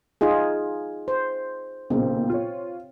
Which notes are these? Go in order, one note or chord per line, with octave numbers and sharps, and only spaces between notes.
D#4 F4 G#4
C5
B1 A#2 C#3 C4
F4 C#5